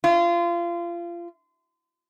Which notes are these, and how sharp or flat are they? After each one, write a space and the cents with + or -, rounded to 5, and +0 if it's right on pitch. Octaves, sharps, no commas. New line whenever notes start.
F4 -25